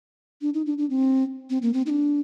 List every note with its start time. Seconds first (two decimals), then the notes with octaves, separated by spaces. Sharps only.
0.42 D4
0.54 D#4
0.66 D4
0.78 D4
0.90 C4
1.50 C4
1.62 A#3
1.74 C4
1.86 D#4
1.90 D4